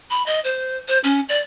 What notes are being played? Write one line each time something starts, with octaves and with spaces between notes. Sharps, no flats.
B5
D#5
C5
C5
C#4
D5